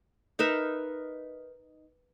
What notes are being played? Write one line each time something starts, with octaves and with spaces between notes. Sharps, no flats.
D#4 A#4 B4 E5